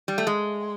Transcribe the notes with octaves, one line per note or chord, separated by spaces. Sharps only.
G3
A3
G#3